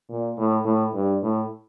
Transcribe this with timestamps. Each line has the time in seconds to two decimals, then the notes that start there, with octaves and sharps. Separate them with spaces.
0.09 A#2
0.37 A2
0.65 A2
0.94 G2
1.22 A2